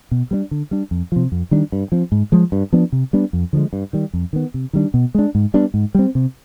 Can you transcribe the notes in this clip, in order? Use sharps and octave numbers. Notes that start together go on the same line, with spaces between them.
B2
G3 B3 D4
D3
G3 D4
F2
C3 F3
F2
D#3 G3 D4
G2
F3 C4
G#2
F3 G#3
G2
F3 B3 D4
C3
G3 B3 D4
F2
D3 F3 G#3
G2
D#3 G3
F2
D#3 B3
C3
D#3 G3 D4
B2
G#3 D4
G#2
G3 B3 D4
G#2
G3 C4
C3